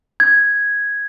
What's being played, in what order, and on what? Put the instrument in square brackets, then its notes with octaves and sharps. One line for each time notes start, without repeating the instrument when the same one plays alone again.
[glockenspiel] G#6